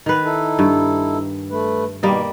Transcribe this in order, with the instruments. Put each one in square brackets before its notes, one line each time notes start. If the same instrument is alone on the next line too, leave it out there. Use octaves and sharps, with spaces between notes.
[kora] D#3 B4
[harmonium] D#4 E4 A4
[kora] G2
[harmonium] A3 B4
[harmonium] B2 D#3 [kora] G3 A#3 D#5